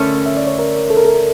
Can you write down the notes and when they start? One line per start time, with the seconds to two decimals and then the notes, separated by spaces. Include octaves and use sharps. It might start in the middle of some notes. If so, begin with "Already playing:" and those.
Already playing: D3 A3 C#4 E4 A#4 C#5
0.26 E5
0.37 D5
0.47 C#5
0.59 A#4
0.90 A4
0.97 A#4
1.05 A4